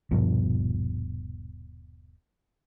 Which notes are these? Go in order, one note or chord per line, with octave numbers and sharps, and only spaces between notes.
D#1 G2 B2 F3